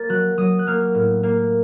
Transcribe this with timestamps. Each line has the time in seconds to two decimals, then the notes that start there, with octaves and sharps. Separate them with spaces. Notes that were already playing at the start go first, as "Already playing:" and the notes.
Already playing: A#3 A6
0.09 F#3 F#6
0.38 F#3 D#6
0.59 F#6
0.67 A#3 F6
0.95 A2
1.23 A#3